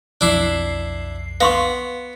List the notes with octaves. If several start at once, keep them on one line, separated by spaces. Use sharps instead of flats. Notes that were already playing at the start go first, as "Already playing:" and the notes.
B1 F2 D4 E4 C7
B3 F5 C6 C#6